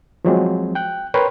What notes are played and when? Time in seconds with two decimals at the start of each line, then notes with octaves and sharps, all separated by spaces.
0.25 F3 F#3 G#3 C4
0.75 G5 F#6
1.14 A#4 B4 C#5 G5 B5 C6